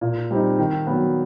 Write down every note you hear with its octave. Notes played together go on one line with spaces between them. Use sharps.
A#2
G3 C4 D#4
D#3
F#3 B3